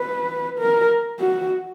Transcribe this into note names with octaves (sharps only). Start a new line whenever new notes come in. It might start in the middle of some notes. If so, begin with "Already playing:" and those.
Already playing: B4
A#4
F#4